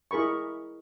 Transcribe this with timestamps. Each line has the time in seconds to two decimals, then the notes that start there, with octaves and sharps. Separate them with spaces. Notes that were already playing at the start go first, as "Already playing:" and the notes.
0.11 E4 G#4 A#4 B5 C#6